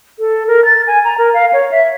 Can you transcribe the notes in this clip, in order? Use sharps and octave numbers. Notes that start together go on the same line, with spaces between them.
A4
A#4
A6
G#5
A#5
A#4
F5
C#5
E5